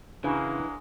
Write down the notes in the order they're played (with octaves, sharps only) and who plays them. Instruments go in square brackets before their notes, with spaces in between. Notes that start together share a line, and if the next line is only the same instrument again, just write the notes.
[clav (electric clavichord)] C#3 [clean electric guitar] E3 [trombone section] F#3 G#3 A#3 [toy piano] D4 F#4 A#5